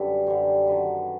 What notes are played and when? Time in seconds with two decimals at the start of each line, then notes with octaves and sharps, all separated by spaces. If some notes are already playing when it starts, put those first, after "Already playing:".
Already playing: F#2 D3 G3 A4 B4
0.26 F#2 D3 G3 A#4 C5
0.67 F#2 D#3 F#3 A4 B4